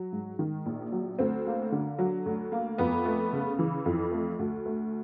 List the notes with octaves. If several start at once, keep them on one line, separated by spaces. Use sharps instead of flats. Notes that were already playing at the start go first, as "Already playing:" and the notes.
Already playing: F#3
G#2
D#3
A#1
F#3
D2 C4
A#3
D3
F#3
D2
A#3
F2 B3
A3
C#3
E3
F2
A3
D2
A3